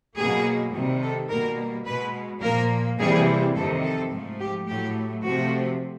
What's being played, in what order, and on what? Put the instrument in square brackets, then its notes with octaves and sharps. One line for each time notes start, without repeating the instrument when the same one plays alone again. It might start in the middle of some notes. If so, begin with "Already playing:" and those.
[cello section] B2 F#3 A#3 G#4
C3 D#3 G3
A4
B2 G3 A#3 A#4
B2 G#3 B4
A#2 F3 A#3 A#4
C3 E3 G3 A#3 G#4
F2 C3 D#3 A4
A4
G#2 F3 A3
G4
A2 F#3 A3 G4
C3 F3 A3 F#4